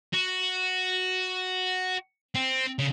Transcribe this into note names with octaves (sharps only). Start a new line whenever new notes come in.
F#4
C4
C#3